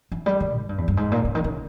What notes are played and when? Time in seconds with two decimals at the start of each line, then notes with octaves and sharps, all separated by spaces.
0.12 E3
0.26 G3
0.40 D#3
0.55 G#2
0.69 G2
0.78 E2
0.88 G2
0.97 G#2
1.12 A#2
1.25 C#3
1.35 D#3
1.44 C#3